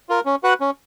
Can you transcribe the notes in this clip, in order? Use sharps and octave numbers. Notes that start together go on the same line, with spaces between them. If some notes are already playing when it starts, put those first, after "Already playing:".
F4 A#4
C#4
F#4 B4 F#5
C#4